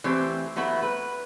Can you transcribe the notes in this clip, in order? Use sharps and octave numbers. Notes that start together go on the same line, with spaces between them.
E3 A3 C4 G4
F#3 A3 B3 E4 B4
B4